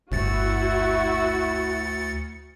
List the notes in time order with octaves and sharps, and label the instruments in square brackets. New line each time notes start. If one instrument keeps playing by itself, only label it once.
[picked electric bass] G1 [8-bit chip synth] D2 A6 C#7 [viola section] E4 F#4